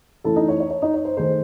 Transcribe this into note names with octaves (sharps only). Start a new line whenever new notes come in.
E3 A3 C#4 E4 A4 A5
D#4 D#5
C#5
C#5
C#5
D#4 D#5
C#5
C5
D#3 A3 D#4 G#4 C5